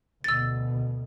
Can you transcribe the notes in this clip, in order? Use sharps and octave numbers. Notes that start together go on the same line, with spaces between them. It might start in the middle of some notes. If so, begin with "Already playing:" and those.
D2 B2 E6 A6